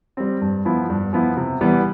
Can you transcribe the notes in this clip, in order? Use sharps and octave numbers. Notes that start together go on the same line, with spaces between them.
G3 C4
G2
F3 B3 E4
G2
F3 B3 E4
C3
E3 G3 B3